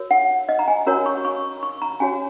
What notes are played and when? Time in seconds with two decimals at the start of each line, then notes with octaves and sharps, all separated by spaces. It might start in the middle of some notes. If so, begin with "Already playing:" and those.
Already playing: F#4 A#4 C#5
0.11 F#5
0.49 D#5
0.59 A#5
0.68 G#5
0.86 C#4 F#4 A#4 C#5 A#5
1.06 C#6
1.25 C#6
1.63 C#6
1.82 A#5
2.00 C#4 F#4 C#5 G#5